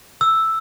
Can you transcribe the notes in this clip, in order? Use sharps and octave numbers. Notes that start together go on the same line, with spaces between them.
E6